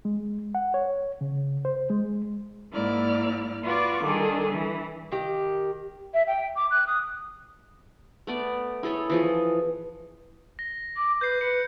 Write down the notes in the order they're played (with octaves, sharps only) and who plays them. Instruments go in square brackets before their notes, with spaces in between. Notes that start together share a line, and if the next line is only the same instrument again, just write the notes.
[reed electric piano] G#3
F#5
C#5
C#3
C5
G#3
[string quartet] G#2 A#3 E4 D5 F6
F4 F#4 B4 D5 C#6 D6
D#3 G3 D4 G#4 A4
E3
[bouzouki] D#3 G4
[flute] E5
G5
D6
F#6
D#6
[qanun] A3 B3 D5
E4 G#4 A4 C#5
E3 F3 G#4
[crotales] A#6
[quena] D6
[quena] B4 [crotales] G6 C7
[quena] B4 [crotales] C#7